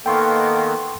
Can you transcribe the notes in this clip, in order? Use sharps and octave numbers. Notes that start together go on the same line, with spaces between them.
D#3 A#3 B3 A4 G5 C6 C#6